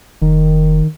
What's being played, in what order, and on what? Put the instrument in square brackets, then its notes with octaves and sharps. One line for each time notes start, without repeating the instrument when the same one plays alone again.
[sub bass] F1 [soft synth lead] D#3